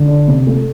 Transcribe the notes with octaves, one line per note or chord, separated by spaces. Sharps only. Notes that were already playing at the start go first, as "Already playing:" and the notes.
Already playing: D3
D4
C3
A3